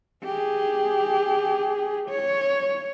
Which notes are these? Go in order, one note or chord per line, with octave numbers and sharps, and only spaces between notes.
G4 G#4
C#5